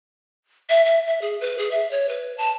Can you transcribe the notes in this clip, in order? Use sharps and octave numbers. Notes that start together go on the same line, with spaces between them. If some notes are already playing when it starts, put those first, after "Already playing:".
E5
E5
E5
G#4
B4
G#4
E5
C#5
B4
A5